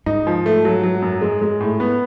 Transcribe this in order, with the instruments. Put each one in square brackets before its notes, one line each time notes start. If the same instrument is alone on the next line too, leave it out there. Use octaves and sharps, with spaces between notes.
[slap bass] G#2 [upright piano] D#4
[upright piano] F3
A3
F#3
F#3
F#2
G#3
G#3
A2
B3